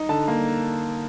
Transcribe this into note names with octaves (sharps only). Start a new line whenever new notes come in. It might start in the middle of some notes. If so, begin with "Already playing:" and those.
Already playing: D#4
D3 A5
A#3